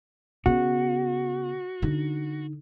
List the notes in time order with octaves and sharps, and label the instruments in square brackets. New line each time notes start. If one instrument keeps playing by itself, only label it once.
[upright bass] C#3 B3 [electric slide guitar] F#4
[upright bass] D3 D#4